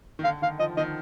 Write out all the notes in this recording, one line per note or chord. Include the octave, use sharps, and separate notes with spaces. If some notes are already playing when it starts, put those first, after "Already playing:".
D#3
D3 F5
D#3 F5
F3 D#5
D#3 D#5